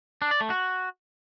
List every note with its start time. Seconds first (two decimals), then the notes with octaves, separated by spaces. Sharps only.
0.22 D4
0.31 D5
0.41 A3
0.50 F#4